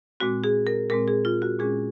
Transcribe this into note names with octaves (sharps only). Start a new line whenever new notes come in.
A#2 G#3 C4 F#4
G#4
A#4
A#2 G#3 C4 A#4
G#4
F4
F#4
A#2 G#3 C#4 G#4